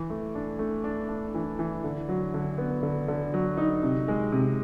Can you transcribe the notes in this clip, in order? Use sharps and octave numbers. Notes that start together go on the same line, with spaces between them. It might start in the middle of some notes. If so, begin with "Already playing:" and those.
Already playing: E3
A3
D4
A3
D4
D4
E3
E3
D3
F#3
D3
B3
D3
D3
F#3
D#4
C3
G#3
C3